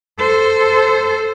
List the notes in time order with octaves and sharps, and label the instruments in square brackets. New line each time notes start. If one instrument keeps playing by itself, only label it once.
[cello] A4 C5